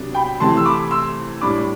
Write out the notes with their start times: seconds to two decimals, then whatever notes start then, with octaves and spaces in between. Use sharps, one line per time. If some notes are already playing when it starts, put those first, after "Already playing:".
Already playing: C3 F#3 B3 D4
0.15 G5 B5
0.40 C3 E3 A3 C4 A5 C6
0.57 E6
0.65 B5 D6
0.91 C6 E6
1.41 A2 G3 D4 B5 D6